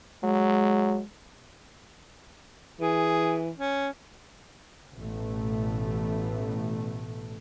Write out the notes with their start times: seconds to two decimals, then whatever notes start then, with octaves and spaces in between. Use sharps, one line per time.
0.24 F#3 G#3
2.80 E3 G#4
3.58 C#4
4.93 A1 B2 A3